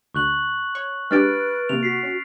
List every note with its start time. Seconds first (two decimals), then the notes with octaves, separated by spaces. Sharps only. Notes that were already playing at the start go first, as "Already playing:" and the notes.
0.14 D2 C#6 F#6 F#7
0.75 C#5
1.11 G#3 D4 G4 B4 F6 A6 D7
1.69 C3 A#3 F7
1.83 F#4 B6 C7
2.03 C#4